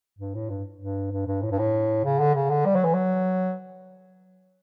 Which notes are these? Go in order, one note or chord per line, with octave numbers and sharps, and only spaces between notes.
G2
A2
G2
G2
G2
G2
A2
G2
A2
C#3
D3
C#3
D3
G3
F#3
E3
F#3